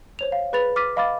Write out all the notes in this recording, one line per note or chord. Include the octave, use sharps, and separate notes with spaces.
C5 C#5 F7
F5
G#4 B4 B5 A6 F7
D6 F6 A6 B6 D#7
D#5 F5 B5 D6 F6 A6